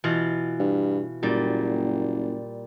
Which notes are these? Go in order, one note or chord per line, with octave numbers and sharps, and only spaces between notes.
B2 E3 F4
G2
F#1 A#2 G3